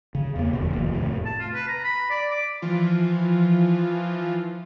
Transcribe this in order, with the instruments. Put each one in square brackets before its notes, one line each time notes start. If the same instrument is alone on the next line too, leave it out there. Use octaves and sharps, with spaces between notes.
[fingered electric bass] C#3
E2 A#3
F1 D2 B2
F1 D#2
A2 C3
[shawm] A5
F4
B4
A#5
B5
D5
D6
[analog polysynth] E3 F3 F4